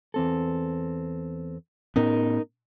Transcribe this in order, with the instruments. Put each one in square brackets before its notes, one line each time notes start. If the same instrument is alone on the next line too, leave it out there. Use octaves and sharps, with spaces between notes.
[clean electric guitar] E2 C4 A4
[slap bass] A2 B3 C#4 [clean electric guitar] D#4 A#4